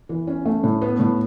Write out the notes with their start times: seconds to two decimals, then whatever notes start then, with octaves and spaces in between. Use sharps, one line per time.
0.09 E3
0.27 C#4
0.45 A3
0.63 A2
0.82 B3
0.99 A2